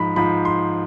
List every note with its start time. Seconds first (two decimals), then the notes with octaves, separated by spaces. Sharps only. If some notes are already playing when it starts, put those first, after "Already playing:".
Already playing: G#2 F3 B5
0.16 G#2 F3 B5
0.45 C6